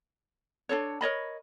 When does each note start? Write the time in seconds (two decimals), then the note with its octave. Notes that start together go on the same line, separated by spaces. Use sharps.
0.69 D4 D#4 A4 C#5
1.01 A#4 C#5 D#5 B5